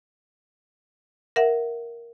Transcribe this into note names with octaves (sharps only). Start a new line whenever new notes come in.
A#4 E5 F#5